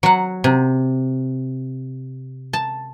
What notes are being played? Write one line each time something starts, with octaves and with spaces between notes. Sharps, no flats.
F#3 F#5
C3
A5